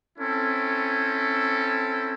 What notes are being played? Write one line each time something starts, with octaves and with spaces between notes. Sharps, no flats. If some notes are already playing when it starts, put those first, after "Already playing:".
C4 C#4 E4 A4